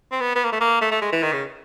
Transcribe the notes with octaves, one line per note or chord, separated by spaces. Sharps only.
C4
B3
B3
A#3
A3
A#3
A3
A3
G#3
E3
D#3
C#3